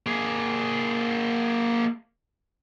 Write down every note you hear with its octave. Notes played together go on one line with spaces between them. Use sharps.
A#3 G#4